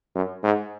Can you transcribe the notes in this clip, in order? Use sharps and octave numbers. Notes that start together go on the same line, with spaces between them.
F#2
G#2